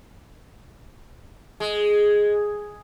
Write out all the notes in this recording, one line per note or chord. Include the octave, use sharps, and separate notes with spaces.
G#3